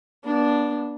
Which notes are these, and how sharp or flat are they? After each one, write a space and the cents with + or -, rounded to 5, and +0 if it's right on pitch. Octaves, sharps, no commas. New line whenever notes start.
B3 -40 D4 -5